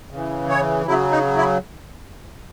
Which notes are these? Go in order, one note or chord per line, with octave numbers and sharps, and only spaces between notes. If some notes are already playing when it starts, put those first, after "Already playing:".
C#3 E3
C#5
C#3 F#3 E4
D#4
E4